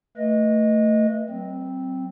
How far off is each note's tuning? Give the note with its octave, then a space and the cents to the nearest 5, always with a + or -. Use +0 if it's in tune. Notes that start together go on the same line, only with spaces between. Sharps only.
A3 +20 B4 -30 D#5 +0
F#3 +30 C4 +0